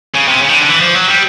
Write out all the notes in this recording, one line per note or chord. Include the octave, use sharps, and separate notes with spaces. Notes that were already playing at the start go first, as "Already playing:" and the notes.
C#3
C3
C#3
D#3
D3
E3
F3
F#3
G3